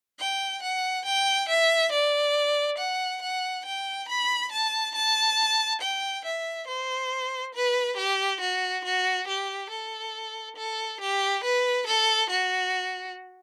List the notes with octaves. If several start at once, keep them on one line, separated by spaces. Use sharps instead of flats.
G5
F#5
G5
E5
D5
F#5
F#5
G5
B5
A5
A5
G5
E5
C5
B4
G4
F#4
F#4
G4
A4
A4
G4
B4
A4
F#4